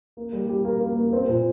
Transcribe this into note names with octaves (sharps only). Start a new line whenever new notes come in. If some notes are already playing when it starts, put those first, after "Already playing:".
A#3
G3
G4
A#3
A#3
A#3
C4
A#2